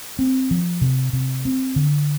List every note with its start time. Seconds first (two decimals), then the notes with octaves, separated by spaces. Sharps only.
0.19 C4
0.51 F3
0.81 C3
1.13 C3
1.45 C4
1.76 D3